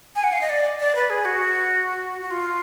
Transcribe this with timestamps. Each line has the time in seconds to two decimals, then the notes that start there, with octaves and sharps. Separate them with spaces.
0.16 G#5
0.24 F#5
0.32 F5
0.41 D#5
0.49 D5
0.80 D5
0.95 B4
1.10 G#4
1.25 F#4
2.21 F#4
2.31 F4